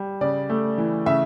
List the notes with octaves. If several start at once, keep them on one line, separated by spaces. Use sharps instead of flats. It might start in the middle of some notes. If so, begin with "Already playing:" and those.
Already playing: G3
C#3 D5
A3
E3
C#3 E5